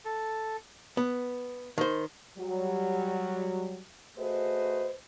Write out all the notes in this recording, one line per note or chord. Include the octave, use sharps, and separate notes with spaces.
A4
B3
D#3 C5
F#3 G3
A3 F#4 G#4 B4 C5 D#5